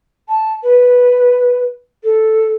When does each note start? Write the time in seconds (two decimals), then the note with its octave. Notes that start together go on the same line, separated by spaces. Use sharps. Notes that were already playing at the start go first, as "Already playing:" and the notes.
0.28 A5
0.63 B4
2.03 A4